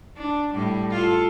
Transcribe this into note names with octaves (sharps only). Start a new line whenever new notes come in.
D4
A2 G3
F4 A4